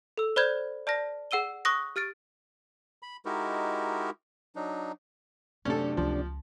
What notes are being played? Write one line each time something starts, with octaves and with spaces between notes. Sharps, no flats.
A4 E6
C5 D5 B5 F6 G6 G#6
D5 A5 F6 A#6
G#4 F#5 E6 D#7 G7
C#6 D#6 F#6 A#6
G4 F6 A6 D7
B5
G#3 D#4 E4 F#4 G4 A#4
F#3 D4 D#4
F#2 C3 F#3 A3 C#4 D4 A4
C#2 F3